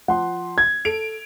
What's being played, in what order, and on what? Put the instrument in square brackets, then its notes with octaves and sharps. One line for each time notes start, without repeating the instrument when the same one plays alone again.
[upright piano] F3 C6 [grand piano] F#5
[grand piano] G#6
[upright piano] A4 D7 F7